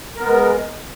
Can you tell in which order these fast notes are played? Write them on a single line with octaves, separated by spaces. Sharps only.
A#4 B3 G#3